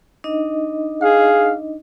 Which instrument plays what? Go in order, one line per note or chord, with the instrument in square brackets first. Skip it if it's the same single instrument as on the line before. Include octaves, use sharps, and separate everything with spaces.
[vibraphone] D4 D#4 D#5
[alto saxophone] G#4 [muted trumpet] F5